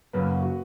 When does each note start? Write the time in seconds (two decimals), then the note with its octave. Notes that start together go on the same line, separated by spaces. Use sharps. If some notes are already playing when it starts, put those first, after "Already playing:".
0.13 F#2 C#3 F#3 A#3 B4
0.42 F#4